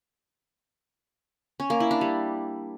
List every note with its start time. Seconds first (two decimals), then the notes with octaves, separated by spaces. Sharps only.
1.60 C#4
1.70 A#3
1.80 E4
1.91 D4
2.01 G3